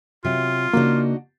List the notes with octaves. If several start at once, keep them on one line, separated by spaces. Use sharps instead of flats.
C3 F#3 F4
C#3 A#3 D4 D#4 F#4